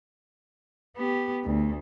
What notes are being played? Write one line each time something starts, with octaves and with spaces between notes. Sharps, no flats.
B3 G4
D2